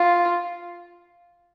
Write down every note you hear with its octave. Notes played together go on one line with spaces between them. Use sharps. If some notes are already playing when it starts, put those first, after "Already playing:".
Already playing: F4